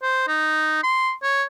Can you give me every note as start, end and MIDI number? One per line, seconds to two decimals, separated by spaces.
0.02 0.26 72
0.28 0.81 63
0.83 1.12 84
1.23 1.43 73